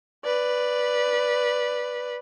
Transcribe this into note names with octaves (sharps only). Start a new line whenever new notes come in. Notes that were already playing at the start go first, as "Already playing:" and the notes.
B4 D5